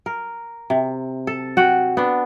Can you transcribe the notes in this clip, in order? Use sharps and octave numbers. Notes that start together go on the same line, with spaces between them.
A#4
C3
A4
F#4 F#5 G5
B3 D4